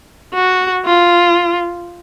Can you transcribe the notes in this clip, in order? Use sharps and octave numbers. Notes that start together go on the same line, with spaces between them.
F#4
F4